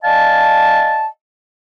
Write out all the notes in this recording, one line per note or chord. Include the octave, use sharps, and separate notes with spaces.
D5 D#5 F5 G#5 A5